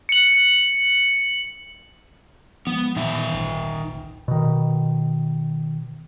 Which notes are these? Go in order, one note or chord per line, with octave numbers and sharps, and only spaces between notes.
C#7 F#7
F3 G#3 B3
A#2 D#3 E3 D#4 E5
G#1 D2 A#2
B2 D#3